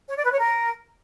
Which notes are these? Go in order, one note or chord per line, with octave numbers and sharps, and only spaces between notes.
C#5
D5
B4
C#5
A#4